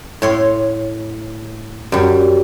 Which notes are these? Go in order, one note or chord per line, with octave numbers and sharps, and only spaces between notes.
A2 C#5 C6
F#2 G3